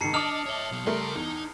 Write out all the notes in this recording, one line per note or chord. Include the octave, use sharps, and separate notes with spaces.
G#2 D#3 A5 C7 C#7
D4 D#5 A5 D6 D#6 F6 F7
C#5 E5
B2 F#3
C#3 G3 A3 A#4 C6
E2 D#4